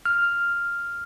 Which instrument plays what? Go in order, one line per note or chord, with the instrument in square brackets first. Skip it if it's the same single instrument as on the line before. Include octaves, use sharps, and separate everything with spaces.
[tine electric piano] F6